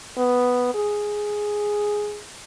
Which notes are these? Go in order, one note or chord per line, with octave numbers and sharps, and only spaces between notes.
B3
G#4